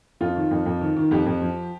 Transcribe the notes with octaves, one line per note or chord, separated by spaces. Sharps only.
F2 F4
D#3
F2
F2
D#3
D#3
F2 G4
F2
F3